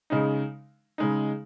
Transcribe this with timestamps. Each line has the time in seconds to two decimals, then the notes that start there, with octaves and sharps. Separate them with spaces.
0.10 C#3 G#3 D#4
0.98 C#3 G#3 D#4